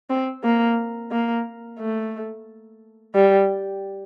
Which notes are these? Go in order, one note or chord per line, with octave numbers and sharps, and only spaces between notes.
C4
A#3
A#3
A3
G3